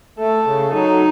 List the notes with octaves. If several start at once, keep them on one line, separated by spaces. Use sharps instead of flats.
A3 A4
C#3
F#3 D#4